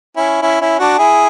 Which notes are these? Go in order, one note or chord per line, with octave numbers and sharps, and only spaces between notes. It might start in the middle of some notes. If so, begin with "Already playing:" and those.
C#4 E4
C#4 E4
C#4 E4
D4 F#4
E4 G#4